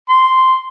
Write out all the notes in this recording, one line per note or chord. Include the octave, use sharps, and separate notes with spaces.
C6